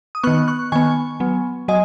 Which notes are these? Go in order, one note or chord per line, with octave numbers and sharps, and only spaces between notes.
D#6
D#3 B3 C#6 F#6
C#6 F#6
D#3 B3 G#5 C#6
F#3 B3
F#3 D#5 G#5